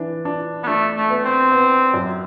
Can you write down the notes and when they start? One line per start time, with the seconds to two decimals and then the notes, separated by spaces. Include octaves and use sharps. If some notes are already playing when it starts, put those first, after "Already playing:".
Already playing: E3 D4
0.25 D4
0.63 B3
0.67 A3 D4
0.96 A3
1.10 B3
1.24 C4
1.52 B3
1.94 F#2